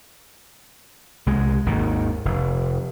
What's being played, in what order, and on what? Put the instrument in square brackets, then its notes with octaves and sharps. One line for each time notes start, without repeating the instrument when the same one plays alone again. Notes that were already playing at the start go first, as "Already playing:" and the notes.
[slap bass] C2 G#3
G#1 D#2 D#3
F1